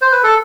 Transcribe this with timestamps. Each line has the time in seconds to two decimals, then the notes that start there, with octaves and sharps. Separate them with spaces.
0.02 C5
0.12 B4
0.23 A4